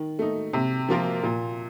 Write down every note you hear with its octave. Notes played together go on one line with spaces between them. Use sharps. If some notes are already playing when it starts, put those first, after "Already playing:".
Already playing: D#3
A3 D#4
C3
F3 A#3 F4 A#4
A#2